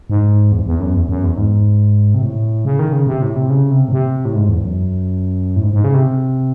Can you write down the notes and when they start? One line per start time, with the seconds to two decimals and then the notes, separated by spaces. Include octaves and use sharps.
0.10 G#2
0.52 E2
0.67 E2
0.80 F#2
0.95 E2
1.09 F#2
1.23 E2
1.37 G#2
2.14 C3
2.22 A2
2.65 C#3
2.79 D#3
2.93 C#3
3.07 C3
3.22 A2
3.36 C3
3.50 C#3
3.71 C3
3.88 A2
3.92 C3
4.25 A2
4.35 G#2
4.49 E2
4.64 F#2
5.56 A2
5.63 G#2
5.73 G#2
5.84 C#3
5.94 C3